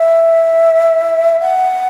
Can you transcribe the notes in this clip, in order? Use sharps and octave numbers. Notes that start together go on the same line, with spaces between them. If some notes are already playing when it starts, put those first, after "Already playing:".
Already playing: E5
F#5